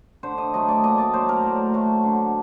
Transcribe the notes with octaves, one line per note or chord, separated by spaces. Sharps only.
D3 C5
D#5
F#3 A3 D#5
D5
A#2 D#5
D5
F#3 A3 C5
A#4
A2
F#3 A3
D3